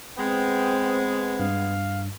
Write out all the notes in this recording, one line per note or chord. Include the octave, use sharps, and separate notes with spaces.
G#3 B3 C4 G5
G2 F5